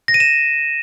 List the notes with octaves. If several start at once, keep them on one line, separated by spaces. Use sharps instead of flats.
A#6
D#7
E7